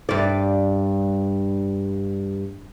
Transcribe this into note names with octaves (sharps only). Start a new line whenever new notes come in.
G2 D5